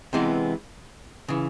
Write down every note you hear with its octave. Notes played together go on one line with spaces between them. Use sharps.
C3 E3 G#3 B3
C#3 E3